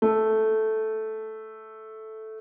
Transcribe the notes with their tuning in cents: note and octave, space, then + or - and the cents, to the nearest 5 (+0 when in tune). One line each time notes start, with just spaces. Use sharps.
A3 -5